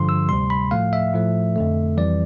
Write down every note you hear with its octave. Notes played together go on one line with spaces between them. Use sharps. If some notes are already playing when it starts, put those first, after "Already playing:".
Already playing: G2 D3 F3 C6
E6
D2 C3 G3 C6
B5
A2 F3 A3 F5
E5
A2 F3 A3
F2 D3 A3
F2 E3 G3 D5